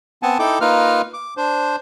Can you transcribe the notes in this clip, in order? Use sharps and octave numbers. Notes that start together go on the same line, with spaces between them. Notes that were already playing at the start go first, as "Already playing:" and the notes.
B3 C4 F#5 G#5 A5
D#4 E4 A4 G5 D6
A#3 D#4 F4 B4 F6
D6
D4 C5